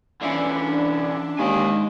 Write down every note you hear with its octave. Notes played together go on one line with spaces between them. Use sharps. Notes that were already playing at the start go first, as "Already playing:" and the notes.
D3 E3 C#4 D4 E4 F4
D#2 G#3 G#5